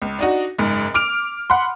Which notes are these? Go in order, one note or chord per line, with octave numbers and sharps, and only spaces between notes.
C#2
D4 D#4 F#4
F#1 G#2
D6 F6 D7 F7
F#5 B5 C6